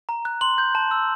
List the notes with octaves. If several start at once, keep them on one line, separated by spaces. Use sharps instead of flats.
A#5
F#6
C6 F#7
G6
A5
E6